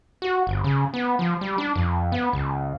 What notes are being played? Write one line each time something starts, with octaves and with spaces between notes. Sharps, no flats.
F#4
G1
C#3
B3
F3
G3
D4
F2
B3
C#2